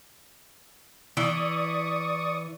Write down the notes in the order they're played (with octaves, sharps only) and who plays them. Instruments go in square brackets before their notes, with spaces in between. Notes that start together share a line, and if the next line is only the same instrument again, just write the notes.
[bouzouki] E3 [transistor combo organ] D5 C#6 D#6